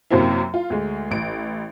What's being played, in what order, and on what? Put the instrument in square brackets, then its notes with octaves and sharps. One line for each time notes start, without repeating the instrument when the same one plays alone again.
[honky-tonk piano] F#2 C3 F#3 A#3 C4 E4
F4
D2 G#3
A1 D7